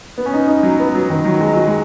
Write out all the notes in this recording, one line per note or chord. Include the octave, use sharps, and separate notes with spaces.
B3
C#4
D#4
D#4
F#3
B3
F#3
D#3
F#3
G#3
F#3
G#3